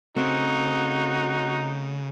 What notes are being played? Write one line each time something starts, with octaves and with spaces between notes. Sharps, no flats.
C#3 A3 C4 D#4 F#4 C5